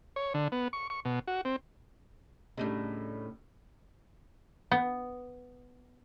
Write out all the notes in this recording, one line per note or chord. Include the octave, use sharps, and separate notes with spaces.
C#5
D3
B3
C#6
C#6
B2
F#4
C4
A2 C#3 G3 A3 D4 D#4
B3